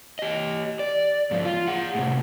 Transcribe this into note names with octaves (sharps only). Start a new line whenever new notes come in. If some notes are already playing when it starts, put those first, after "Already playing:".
G4 D#5
D5
G#2 F3
F4
G#4 F#5
A2 C3